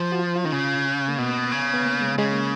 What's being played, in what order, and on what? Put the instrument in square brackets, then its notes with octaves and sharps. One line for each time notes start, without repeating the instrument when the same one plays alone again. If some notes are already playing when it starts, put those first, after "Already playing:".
Already playing: [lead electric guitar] F3
[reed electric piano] F#4
F4
F4
[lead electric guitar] D#3 [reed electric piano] C#4
[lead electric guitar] C#3
[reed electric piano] A#3
[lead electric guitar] B2 [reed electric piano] B3
[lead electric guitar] C#3
[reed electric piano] B3
A#3
G#3
[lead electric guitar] C#3 [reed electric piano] G#3
[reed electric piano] A#3